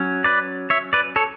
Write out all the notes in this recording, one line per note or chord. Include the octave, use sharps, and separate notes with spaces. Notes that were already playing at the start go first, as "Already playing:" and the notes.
Already playing: F#3 C#4
B4 D5
C#5 E5
B4 D5
A4 C#5